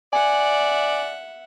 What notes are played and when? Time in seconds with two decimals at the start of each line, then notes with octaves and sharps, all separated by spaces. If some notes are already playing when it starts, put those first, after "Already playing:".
0.13 D5 E5 F#5 G#5